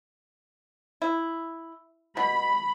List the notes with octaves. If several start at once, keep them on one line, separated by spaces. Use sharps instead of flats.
E4
B2 B5